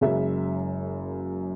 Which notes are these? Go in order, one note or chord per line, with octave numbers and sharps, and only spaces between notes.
F#1 F#2 C#3 G#3 E5